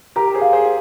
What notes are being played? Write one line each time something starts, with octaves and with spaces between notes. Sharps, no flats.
G4 A#4 A#5
G#4 C5
F5
G#4 C5
G#4